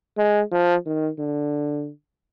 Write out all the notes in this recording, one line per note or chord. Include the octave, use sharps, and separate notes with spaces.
G#3
F3
D#3
D3